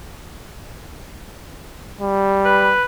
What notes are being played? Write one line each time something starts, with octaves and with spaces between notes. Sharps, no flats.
G3
B4